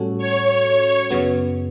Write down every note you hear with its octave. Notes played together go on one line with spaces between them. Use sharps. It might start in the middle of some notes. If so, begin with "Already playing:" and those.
Already playing: A2 G3 C#4 F#4 A4
C#5
F#2 C#3 F#3 B3